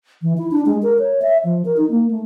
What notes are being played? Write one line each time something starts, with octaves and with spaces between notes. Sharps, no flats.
E3
E4
D4
G#3
A#4
C#5
E5
F3
A#4
D#4
A#3
A3